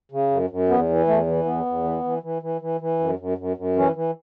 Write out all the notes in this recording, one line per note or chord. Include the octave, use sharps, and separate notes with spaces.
C#3
F#2
F#2
E2 B3
E3
E2 A3
E3
E2 B3
E2
E3
E3
E3
E3
E3
E3
F#2
F#2
F#2
F#2
E3 C#4
E3